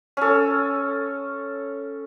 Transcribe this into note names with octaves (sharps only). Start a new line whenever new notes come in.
C#4 A4